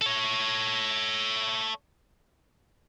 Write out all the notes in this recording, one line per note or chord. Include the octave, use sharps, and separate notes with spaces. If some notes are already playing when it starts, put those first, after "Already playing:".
A4 C#5